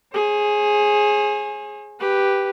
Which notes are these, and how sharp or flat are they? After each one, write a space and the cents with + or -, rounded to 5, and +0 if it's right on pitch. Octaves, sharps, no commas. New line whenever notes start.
G#4 +5 C#5 -45
G4 +0 B4 +0